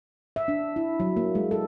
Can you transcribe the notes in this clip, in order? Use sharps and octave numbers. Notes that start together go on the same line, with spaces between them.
E5
D4
E4
F#3
A#3
G#3
A4